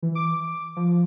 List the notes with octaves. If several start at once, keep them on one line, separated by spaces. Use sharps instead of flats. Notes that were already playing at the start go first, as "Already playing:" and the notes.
E3
D6
F3